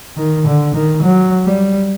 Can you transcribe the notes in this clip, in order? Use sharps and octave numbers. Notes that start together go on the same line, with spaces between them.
D#3
D3
D#3
F#3
G3